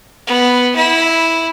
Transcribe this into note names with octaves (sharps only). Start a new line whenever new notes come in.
B3
E4